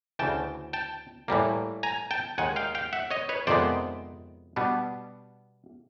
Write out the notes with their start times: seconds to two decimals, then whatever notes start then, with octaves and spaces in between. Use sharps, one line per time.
0.19 D2 C#3 E3 G5 A5
0.73 G5 A5
1.28 A2 E3 G3 A#3
1.83 G#5 A#5
2.11 G5 A5
2.38 D#2 D#3 G#3 F#5 G#5
2.56 F5 G5
2.75 F5 G5
2.93 E5 F#5
3.11 C#5 D#5
3.29 B4 C#5
3.47 F2 C3 D#3 G#3 B3 C5 D5
4.56 B2 G3 B3 D4